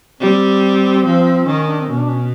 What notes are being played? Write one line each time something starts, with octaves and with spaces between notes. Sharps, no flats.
G3 C4
F3
D#3 C#4
D4
C4
B2 C#4
D4
C#4